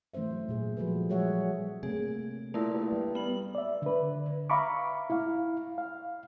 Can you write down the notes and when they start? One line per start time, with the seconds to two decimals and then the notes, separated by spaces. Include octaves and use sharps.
0.14 E3 A3 C#4 C5 E5
0.31 F#3
0.49 A#2 G#4
0.77 F3 G3 F#4 G#4 A4 B4
1.10 F#3 G#3 G#4 C#5 E5 F#5
1.83 C3 A3 A#3 G#4
2.54 A#2 A3 A#3 E4
2.73 G2
2.92 G3
3.15 B3 F#7
3.55 D5 E5
3.82 D3 B4
4.50 E5 F5 A#5 B5 C#6 D6
5.10 E4 F5
5.78 F5